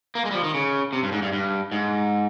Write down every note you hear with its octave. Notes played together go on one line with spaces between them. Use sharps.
A#3
G#3
G3
F3
D#3
C#3
C3
G2
G#2
G2
G2
G#2